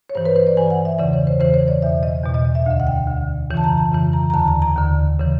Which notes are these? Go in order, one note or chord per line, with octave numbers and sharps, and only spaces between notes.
C#5
G2 E3 C5
B4
C5
D5
G2 E3 G#5
F#5
E5
E2 C#3 E3 D5
C#5
C5
E2 C#3 E3 C5
C#5
D5
E2 B2 E5
D#5
E2 B2
D#5
D#5
E5
D2 D3 F5
F#5
G5
D2 D3
F2 C#3 E3
A5
A#5
A5
F2 C#3 E3
A#5
A#5
D#2 D3 A5
A#5
A#5
D#2 D3
C#3 E3